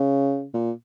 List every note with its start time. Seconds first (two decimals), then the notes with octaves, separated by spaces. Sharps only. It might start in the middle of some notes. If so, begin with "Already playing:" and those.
Already playing: C#3
0.54 A#2